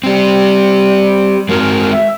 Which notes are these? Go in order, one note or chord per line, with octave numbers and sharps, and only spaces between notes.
G3 C4 G4
G#3 C4 F#4 A#4
E5